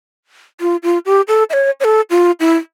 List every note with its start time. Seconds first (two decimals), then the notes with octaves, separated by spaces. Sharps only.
0.61 F4
0.83 F4
1.06 G4
1.28 A4
1.50 E5
1.53 C#5
1.80 C#5
1.84 A4
2.10 F4
2.40 E4